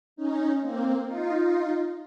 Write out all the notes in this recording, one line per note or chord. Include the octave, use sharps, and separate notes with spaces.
C#4 D#4
A#3 C4
D#4 F4